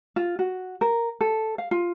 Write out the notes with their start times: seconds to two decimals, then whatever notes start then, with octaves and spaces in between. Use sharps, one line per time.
0.16 F4
0.39 F#4
0.81 A#4
1.21 A4
1.58 F5
1.71 F4